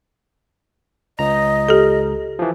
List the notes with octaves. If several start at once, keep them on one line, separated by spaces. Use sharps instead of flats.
C#2 D#5 A#5
G4 A4
E3 F3